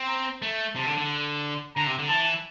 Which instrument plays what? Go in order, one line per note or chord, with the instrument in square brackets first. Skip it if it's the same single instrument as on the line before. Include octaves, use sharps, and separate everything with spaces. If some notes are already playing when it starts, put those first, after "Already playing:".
Already playing: [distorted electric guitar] C4
[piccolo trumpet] A#5
[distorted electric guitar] A3
[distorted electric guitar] C3 [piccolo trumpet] A5
[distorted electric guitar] D3
D3
[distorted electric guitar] D3 [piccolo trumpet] A#5
[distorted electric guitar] C3
D3
[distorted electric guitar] E3 [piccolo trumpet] A5